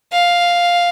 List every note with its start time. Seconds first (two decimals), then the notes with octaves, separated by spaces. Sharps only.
0.12 F5